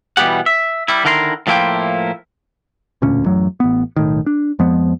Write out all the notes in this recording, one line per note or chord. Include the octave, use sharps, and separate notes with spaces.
B2 E3 G3 B3 G4 F#5
E5
G3 E4
D3 D#3 E4 A#4 F#5 C6
A2 F3 A#3 E4 F4 G5
E1 D2 A#2 C#4
A1 F#2 A2 F#3
A1 B3
B1 A2 D#3
D4
F2 F3 G#3 B3